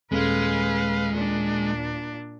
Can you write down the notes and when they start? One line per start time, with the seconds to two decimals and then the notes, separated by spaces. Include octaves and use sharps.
0.12 D#1 G#3 B4 F5
1.12 A#2 D4